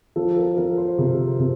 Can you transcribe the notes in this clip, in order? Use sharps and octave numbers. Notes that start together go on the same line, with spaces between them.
F3 A4
A#4
F3 A#4
C5
C3
C3